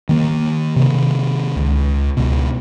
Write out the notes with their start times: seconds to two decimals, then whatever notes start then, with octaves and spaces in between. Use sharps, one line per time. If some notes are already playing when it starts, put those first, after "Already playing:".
0.09 D#3 A#3
0.76 C3 D#3
1.56 C#2
2.17 C#2 B2